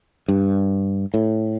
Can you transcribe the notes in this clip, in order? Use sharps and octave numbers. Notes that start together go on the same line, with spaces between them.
G2
A2